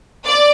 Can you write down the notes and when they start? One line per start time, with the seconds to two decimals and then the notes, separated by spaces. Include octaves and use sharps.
0.25 D5